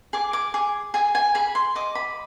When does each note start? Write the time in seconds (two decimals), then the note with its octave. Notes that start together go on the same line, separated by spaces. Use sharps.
0.13 G#4 D6
0.33 D6
0.54 G#4
0.94 G#4 G#5
1.15 G#5
1.35 G#4 B5
1.55 C6
1.75 D#5 D6
1.95 B5